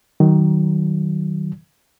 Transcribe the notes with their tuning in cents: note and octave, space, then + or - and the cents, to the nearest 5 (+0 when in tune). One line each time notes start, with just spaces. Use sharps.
D#3 +0 F#3 +25